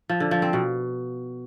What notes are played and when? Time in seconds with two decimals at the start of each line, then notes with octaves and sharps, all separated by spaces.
0.09 F3
0.20 D3
0.31 F3
0.42 C4
0.53 B2